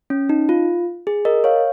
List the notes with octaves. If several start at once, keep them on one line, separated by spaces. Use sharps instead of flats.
C#4
D#4
F4
G#4
A#4 D#5
C#5 F5